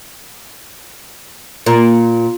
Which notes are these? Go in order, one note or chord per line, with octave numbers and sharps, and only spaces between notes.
A#2